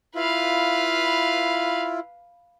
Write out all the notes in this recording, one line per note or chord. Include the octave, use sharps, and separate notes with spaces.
E4 F4 B4 F5